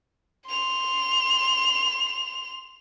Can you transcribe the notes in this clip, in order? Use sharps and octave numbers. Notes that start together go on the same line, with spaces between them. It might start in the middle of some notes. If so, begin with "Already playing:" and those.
C6 F7